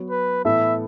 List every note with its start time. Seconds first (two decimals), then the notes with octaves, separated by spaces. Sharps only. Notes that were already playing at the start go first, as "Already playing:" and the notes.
Already playing: F#3 B3 F#4 C#5
0.10 B4
0.45 A2 E3 B3 E4 A4 E5